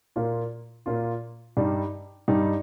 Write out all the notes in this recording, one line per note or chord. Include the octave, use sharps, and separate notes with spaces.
A#2 A#3 F4
A#2 A#3 F4
G2 G3 D#4
G2 G3 D#4